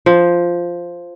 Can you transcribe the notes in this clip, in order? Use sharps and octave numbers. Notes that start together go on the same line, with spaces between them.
F3